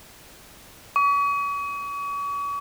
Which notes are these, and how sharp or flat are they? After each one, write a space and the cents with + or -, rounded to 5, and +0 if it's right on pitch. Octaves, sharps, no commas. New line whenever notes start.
C#6 +40